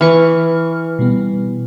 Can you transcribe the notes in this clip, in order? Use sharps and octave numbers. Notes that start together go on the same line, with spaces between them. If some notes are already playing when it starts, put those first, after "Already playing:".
E3 B4 C#6 F6
B2 G3 B3